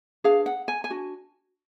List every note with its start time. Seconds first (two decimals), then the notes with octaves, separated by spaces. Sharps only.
0.24 D4 G#4 B4 F5
0.46 F#5
0.68 G#5
0.84 G#5
0.90 D4 F#4